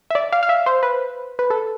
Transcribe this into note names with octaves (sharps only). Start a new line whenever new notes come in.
E5
D5
F5
F5
E5
C5
B4
B4
A4